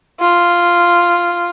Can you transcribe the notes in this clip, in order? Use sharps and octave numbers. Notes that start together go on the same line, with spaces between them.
F4